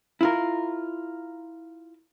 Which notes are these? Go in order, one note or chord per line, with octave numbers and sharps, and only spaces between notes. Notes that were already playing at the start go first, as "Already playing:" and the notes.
E4 F4 A#4